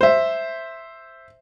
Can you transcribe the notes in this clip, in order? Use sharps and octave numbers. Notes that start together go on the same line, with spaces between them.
C5 E5